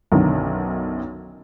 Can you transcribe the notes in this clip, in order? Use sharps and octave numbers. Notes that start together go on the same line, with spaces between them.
B1 F#2 D3 D#3